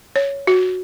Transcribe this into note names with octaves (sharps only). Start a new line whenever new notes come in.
C#5
F#4